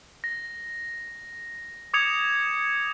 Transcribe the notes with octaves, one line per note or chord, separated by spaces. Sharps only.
A#6
D6 D#6 G#6 C#7 F7